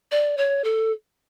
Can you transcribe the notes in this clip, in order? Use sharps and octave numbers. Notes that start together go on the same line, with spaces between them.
D5
C#5
A4